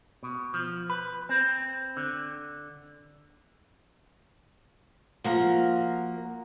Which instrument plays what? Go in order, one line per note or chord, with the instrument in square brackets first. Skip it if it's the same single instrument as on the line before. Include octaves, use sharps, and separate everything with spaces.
[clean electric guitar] B2
F3
B4
C4
D3
[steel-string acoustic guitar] F3 A#3 [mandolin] F#4 A#4